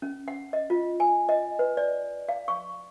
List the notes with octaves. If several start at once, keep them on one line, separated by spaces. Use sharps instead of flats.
C#4
F#5
D#5
F4
G#5
D#5
B4
D5
F5
C#6